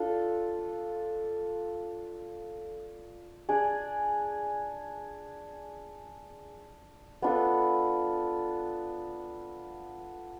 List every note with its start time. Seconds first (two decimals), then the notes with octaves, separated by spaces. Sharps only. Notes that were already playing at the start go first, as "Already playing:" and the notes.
Already playing: D4 F4 A4 F5
3.49 D4 G#4 D5
7.22 B3 D4 F4 A4